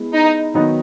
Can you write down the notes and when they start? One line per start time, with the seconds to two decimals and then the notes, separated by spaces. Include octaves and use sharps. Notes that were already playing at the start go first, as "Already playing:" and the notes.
Already playing: G#3 B3 E4
0.14 D#4
0.54 D#3 F#3 B3 D#4